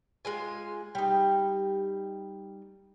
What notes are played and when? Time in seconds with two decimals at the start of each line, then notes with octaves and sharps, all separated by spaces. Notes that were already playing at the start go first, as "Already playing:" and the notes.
0.25 G#3 F4 G#5
0.95 G3 D#4